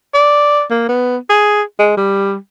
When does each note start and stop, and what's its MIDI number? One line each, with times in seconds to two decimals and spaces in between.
0.14 0.63 74
0.70 0.85 58
0.89 1.17 59
1.30 1.62 68
1.79 1.94 56
1.97 2.36 55